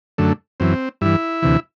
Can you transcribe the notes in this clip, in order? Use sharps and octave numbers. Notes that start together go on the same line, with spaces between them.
F#2 D3 A3
F#2 E3 C4
G2 E3 E4
D2 C3 E3